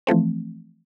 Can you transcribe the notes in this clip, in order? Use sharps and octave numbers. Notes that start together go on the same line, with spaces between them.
E3 F3 A3 C4